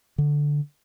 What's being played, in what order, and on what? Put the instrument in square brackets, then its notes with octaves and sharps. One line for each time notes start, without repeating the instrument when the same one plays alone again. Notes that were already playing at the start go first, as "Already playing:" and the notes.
[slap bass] D3